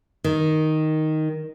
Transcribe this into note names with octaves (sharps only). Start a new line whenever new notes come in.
D#3